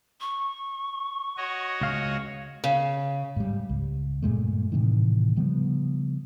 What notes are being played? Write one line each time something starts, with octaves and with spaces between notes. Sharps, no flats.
C#6
F#4 C#5 D#5
C#2 F5
C#3
G#2 G3
C#2
G2 A#2 G#3 A3
A2 C3 D#3 E3
C#3 F3 G3 B3